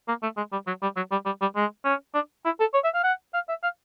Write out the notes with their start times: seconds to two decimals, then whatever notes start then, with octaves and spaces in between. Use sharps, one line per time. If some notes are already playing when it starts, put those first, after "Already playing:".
0.08 A#3
0.23 A3
0.37 G#3
0.52 G3
0.67 F#3
0.82 G3
0.96 F#3
1.11 G3
1.26 G3
1.41 G3
1.56 G#3
1.85 C#4
2.14 D4
2.45 E4
2.60 A4
2.74 C#5
2.84 E5
2.94 F5
3.04 F#5
3.34 F5
3.49 E5
3.63 F5